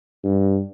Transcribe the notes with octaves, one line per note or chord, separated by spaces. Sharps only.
G2